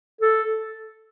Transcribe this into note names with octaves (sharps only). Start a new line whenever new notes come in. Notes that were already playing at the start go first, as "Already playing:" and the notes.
A4